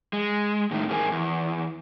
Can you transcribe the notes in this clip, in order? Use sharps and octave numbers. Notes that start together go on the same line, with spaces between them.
G#3
A2 D#3
E2 G#2 G#3 A#4 G#5
E2